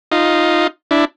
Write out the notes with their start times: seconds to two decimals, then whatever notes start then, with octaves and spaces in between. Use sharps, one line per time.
0.12 D#4 F4
0.91 D4 E4